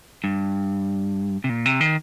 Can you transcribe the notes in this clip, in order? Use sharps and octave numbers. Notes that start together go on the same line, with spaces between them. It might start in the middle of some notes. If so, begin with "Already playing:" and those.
G2
C3
A#2
C3
D#3